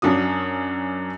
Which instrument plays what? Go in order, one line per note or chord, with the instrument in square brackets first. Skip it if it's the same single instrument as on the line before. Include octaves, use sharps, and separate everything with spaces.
[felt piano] F#2 D4 F#4 D#6